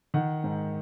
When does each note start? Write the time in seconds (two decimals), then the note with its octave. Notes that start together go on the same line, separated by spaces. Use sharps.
0.14 D#3 F#5
0.44 G#2